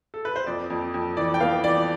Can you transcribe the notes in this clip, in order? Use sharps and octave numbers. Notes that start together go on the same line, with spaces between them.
A4
B4
C5
F2 D5
F2
F2
E3 D5
G5
B3 F5
E3 D5